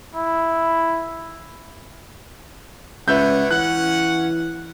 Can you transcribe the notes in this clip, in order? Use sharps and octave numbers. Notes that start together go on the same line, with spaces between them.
E4
C#2 B4 C#5 D5 E5 F#5 G6
E3 C#4 F#5 F#6